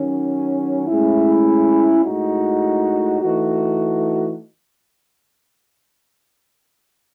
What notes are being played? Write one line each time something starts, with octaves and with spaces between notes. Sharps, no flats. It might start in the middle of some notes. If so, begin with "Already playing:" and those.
Already playing: D#3 F#3 C#4
A2 G#3 C#4 E4
A2 G#3 D#4 F#4
E3 A3 D#4 F#4